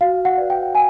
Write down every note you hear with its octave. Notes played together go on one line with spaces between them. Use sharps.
F#4 F5
F#5
B4 D5
G5
G#5